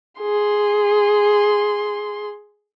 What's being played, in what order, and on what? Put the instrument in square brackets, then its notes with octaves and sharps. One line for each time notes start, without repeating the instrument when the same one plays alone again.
[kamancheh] G#4 C6